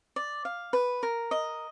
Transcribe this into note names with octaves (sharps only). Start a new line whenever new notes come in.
D5
F5
B4
A#4
D#5